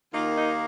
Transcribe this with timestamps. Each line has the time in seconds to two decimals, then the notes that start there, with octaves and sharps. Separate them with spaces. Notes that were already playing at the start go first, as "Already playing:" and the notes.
0.13 D#2 D#3 A#3 F4
0.35 D#4